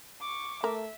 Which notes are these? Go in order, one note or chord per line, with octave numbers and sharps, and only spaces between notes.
C#6 D6
A3 A#4 E5